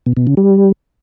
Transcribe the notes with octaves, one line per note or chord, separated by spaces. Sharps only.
B2
B2
C#3
G3